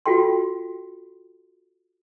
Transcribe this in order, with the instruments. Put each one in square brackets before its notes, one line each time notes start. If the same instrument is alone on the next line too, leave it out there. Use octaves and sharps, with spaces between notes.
[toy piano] F4 F#4 A4 G5 C6